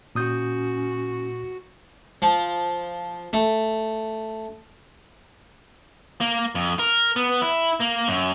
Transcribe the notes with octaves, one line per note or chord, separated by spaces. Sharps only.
A#2 C#4 F#4 D#6 G6
F3
A3
A#3
F2
A#4
B3
E4
A#3
F#2